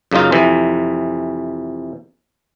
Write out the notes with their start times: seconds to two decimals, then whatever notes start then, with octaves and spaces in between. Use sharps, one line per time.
0.11 F#2 C#3 A#3 D#4 F4
0.32 F2 C3 E3